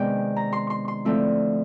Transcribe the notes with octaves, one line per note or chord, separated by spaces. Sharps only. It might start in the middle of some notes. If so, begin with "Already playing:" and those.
Already playing: C3 D#3 G#3 B3 D4 G5
A#5
C6
C6
C6
D3 F3 A3 C4 E4